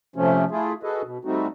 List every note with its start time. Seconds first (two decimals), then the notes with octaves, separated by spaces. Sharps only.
0.16 C3 F3 A3 C#4
0.51 A3 E4 F4 G#4
0.83 F#4 G#4 A4 B4 D#5
1.03 B2
1.25 G3 A3 C4 D#4 F#4